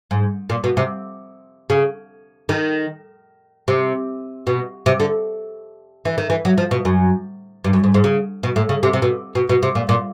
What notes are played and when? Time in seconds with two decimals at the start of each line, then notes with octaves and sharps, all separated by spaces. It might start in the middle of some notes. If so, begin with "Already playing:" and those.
0.11 G#2
0.50 A#2
0.64 B2
0.77 C3
1.70 C#3
2.49 D#3
3.68 C3
4.47 B2
4.86 C3
5.00 D3
6.05 E3
6.18 D#3
6.30 E3
6.45 F#3
6.58 F3
6.71 B2
6.85 F#2
7.64 G2
7.73 F#2
7.84 G#2
7.94 G#2
8.04 C#3
8.43 B2
8.56 A2
8.69 C#3
8.83 C3
8.93 C3
9.02 B2
9.35 B2
9.49 B2
9.63 C3
9.75 A#2
9.89 A#2